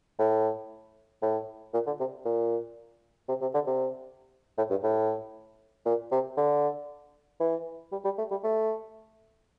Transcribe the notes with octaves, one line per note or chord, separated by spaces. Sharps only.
A2
A2
A#2
D3
C3
A#2
C3
C3
D3
C3
A2
G2
A2
A#2
C3
D3
E3
G3
G3
A3
G3
A3